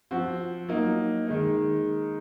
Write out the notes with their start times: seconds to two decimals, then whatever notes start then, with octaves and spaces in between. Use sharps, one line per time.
0.11 F3 C4 F#4
0.69 F#3 A#3 D#4
1.27 D#3 G#3 D#4